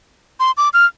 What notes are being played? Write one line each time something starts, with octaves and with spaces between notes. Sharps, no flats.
C6
D6
F6